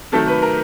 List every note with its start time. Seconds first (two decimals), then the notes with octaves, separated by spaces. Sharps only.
0.12 C3 D#3 F#3 A3 A4
0.27 B4
0.42 A#4